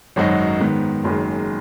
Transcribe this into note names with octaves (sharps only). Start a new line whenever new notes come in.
G#1 F#2 F#3 D#4 F#4
G#2 D#3 B3
F#1 F#2 D#3 G#3